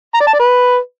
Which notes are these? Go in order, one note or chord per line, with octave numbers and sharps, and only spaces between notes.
A#5
D5
A5
D5
B4